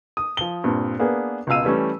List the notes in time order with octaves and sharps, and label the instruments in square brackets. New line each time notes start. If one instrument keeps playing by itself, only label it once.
[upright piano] D#6
F3 G7
G2 A#2 C4
A#3 B3 D4 G#4
C#2 B2 F4 F5 E6 D#7
E3 G3 A3 C#4